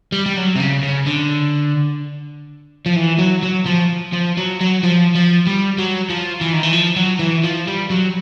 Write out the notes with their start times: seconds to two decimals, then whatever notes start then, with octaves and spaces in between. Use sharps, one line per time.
0.12 G3
0.26 G3
0.36 F#3
0.55 C3
0.60 C#3
0.83 C#3
1.06 D3
2.86 F3
2.96 E3
3.19 F#3
3.43 F#3
3.66 F3
4.13 F3
4.37 F#3
4.61 F#3
4.83 F3
5.16 F3
5.47 G3
5.78 F#3
6.10 F3
6.41 E3
6.53 D#3
6.63 E3
6.73 F3
6.96 F#3
7.19 E3
7.44 F3
7.68 G3
7.91 F#3